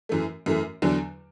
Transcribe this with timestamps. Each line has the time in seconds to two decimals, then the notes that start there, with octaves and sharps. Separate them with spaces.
0.09 F#2 E3 A3
0.46 F#2 E3 A3
0.82 E2 D3 F#3 D4